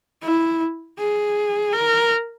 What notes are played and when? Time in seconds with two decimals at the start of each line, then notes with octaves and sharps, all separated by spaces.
0.23 E4
0.98 G#4
1.73 A#4